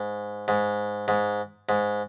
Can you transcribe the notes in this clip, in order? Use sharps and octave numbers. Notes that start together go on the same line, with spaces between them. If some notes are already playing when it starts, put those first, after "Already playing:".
Already playing: G#2
G#2
G#2
G#2